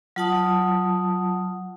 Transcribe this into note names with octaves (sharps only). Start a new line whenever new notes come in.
F#3 F4 F#5 A5 D#6